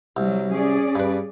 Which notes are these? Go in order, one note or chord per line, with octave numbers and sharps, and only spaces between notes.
C2 F#3 G3
C#4 G#4 D5
G2 B4